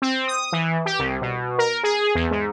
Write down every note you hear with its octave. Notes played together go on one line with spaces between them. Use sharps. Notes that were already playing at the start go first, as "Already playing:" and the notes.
C4
D#6
E3
G4
C2
B2
A#4
G#4
E2
G#2